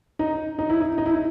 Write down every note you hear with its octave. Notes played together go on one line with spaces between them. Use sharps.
D#4
D#4
E4
D#4
D#4
E4
D#4